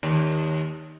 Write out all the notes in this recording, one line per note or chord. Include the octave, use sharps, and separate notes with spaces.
D#2